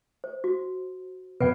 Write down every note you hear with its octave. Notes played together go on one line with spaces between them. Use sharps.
C5
F#4
F2 B2 B4 F#5